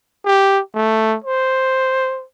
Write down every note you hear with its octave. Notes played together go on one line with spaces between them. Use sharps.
G4
A3
C5